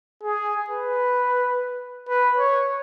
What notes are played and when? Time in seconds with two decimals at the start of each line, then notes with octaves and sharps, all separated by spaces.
0.23 G#4
0.70 B4
2.09 B4
2.38 C#5